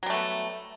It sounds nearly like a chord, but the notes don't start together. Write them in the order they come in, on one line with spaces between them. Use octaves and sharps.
F#3 G3 A3 B3